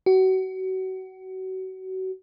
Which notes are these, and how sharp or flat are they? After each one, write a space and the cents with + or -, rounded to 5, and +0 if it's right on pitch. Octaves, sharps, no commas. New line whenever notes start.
F#4 +30